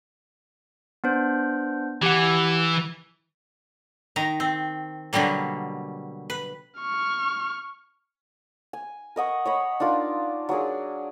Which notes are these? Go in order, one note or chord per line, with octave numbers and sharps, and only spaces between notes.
B3 D4 C5
E3 G4 F#5
D#3 A#5
C4
B2 D3 F#3 G3 A#3
B4
C#6 F6
G#5
A#4 D#5 F#5 C#6
C#5 D#5 B5
D4 D#4 F4 A#4
F#3 D4 G#4 A#4